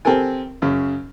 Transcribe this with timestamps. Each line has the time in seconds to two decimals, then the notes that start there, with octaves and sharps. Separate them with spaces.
0.05 C4 G4 A4 A#4 G#5
0.62 F#2 C#3